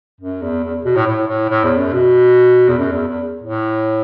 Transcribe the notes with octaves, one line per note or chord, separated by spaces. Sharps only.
F#2
E2
E2
B2
A2
A2
A2
A2
E2
F#2
B2
E2
F#2
E2
E2
A2